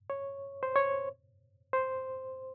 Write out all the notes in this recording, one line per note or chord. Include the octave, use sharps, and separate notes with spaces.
C#5
C5
C#5
C5